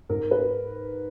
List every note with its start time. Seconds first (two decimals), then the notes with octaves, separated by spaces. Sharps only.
0.09 G#2 A#4
0.31 B4